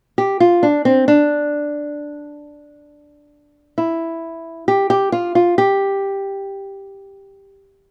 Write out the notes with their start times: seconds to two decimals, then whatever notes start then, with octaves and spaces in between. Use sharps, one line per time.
0.18 G4
0.40 F4
0.63 D4
0.85 C4
1.08 D4
3.78 E4
4.68 G4
4.90 G4
5.12 F4
5.35 F4
5.58 G4